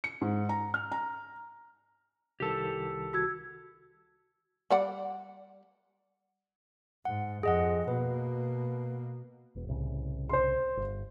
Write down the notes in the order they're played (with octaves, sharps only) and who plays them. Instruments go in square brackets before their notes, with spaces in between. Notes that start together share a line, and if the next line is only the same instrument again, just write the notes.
[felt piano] C#7
G#2
A#5
F6
A#5
[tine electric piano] C2 D#3 A5 [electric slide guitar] G4 A4
[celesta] F#4 E6 G#6
[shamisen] G3 D5 F#5
[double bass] G#2 [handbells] F#5
[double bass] F2 [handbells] G#4 D#5 F#5
[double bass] B2 A#3 [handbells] B4
[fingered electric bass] E1 E2
C2 A2 C#3
[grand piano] C5 C6
[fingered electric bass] G1